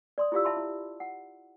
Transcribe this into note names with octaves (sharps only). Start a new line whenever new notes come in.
D5 C6 D#6
E4 F4 G4 D5 F5 E6
E5 A5 B5 C6
E4
F#5